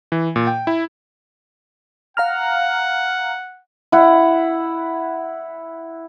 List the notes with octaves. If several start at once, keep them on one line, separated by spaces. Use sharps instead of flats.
E3
A#2
G5
E4
F5 F#5 A#5 F6
E4 F#5